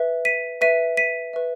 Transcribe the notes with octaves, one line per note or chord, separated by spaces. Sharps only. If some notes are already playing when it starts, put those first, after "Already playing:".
Already playing: B4 E5
B6 D#7
B4 E5 B6 D#7
B6 D#7
B4 E5